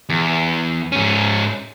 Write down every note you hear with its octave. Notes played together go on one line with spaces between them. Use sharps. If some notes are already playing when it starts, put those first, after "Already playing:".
E2
G#2 C#4